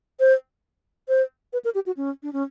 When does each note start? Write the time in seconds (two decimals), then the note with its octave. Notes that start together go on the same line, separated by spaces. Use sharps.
0.20 C5
1.09 C5
1.53 B4
1.65 A#4
1.75 G4
1.86 F#4
1.97 C#4
2.23 D4
2.33 C#4